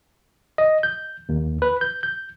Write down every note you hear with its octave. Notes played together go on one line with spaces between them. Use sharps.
D#5
G6
D#2
B4
G6
G6